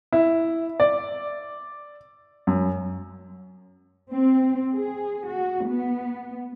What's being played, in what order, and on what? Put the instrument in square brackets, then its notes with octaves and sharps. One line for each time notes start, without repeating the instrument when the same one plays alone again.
[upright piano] E4
D5
F#2
[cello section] C4
G#4
F#4
B3